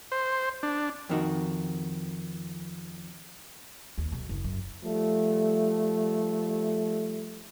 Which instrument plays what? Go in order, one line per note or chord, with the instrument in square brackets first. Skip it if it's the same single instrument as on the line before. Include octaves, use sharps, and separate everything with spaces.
[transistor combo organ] C5
D4
[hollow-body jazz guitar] F2 D#3 F#4
[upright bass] D#2
B1
F#1
F#2
[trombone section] F3 G3 A3